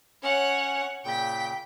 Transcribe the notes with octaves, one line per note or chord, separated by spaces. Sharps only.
C#4 C#5 F#5
A#2 C#3 G5 B6